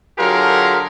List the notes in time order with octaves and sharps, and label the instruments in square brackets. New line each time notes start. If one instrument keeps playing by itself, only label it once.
[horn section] D3 F#3 F4 G4 G#4 A#4